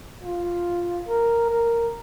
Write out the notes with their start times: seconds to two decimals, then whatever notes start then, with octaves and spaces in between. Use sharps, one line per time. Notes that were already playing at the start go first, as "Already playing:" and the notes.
0.24 F4
1.08 A#4
1.50 A#4